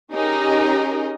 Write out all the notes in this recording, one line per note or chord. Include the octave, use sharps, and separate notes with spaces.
C#4 D#4 G4 G#4 A#4 D#5